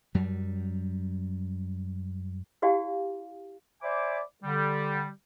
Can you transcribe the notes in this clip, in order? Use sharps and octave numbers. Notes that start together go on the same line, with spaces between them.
F#2 F#3 G3
E4 F#4 G4 D5 F5 G#5
C5 D5 E5 G#5 B5 D6
D3 G3